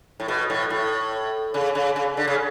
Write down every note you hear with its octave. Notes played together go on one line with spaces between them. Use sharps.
A2
B2
A2
A2
C#3
C#3
C#3
D3
C#3